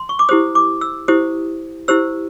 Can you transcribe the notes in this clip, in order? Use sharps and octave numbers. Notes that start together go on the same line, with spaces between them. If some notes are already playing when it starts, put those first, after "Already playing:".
Already playing: C6
C#6
D6
E4 G4 C5 D#6
D6
E6
E4 G4 C5 D#6
E4 G4 C5 E6